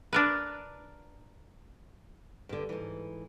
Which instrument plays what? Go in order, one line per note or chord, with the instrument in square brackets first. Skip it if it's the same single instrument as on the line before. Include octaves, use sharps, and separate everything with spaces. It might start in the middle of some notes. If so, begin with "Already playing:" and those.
[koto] D4 A#4 B4
[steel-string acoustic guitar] G2 D3
G#2 E3